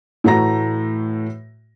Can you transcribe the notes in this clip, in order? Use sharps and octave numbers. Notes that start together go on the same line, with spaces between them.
A2 E3 A3 F#4 A#5 A#6